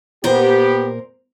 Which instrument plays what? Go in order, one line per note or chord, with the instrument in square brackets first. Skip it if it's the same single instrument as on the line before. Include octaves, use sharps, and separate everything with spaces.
[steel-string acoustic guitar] A#2 A#4 C5 [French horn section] B3 G4